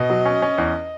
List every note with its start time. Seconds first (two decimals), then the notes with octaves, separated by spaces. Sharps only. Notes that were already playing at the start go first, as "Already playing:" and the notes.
Already playing: B2 D#5
0.10 F#3
0.26 C#4
0.42 C#4
0.58 E2